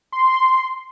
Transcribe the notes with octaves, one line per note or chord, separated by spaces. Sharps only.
C6